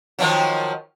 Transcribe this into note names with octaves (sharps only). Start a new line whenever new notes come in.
D#3 F3 F#3